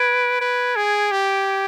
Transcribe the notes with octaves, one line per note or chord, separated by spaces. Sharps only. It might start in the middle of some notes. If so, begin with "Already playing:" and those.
Already playing: B4 G#6 D7
B4
G#4
G4